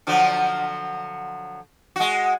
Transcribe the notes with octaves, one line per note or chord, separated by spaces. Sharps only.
D3 F3 F#3
G#3 F#4